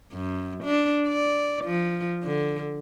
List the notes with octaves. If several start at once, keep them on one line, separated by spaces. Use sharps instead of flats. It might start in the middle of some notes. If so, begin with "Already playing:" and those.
F#2
D4
D5
F3
D3